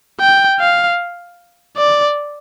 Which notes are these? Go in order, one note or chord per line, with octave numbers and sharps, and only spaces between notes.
G5
F5
D5